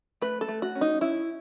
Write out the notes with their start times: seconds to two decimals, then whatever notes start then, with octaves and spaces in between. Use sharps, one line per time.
0.22 A3 B4
0.41 A4
0.49 A3
0.62 F#4
0.75 C#4
0.81 D#4
1.01 C#4 E4